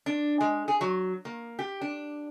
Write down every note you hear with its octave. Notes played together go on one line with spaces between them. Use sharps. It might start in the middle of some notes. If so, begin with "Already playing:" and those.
D4
G#3
G#4
F#3
A#3
G4
D4